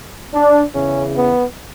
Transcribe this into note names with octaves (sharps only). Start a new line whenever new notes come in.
D4
E2 C#3 E3 C#4
B3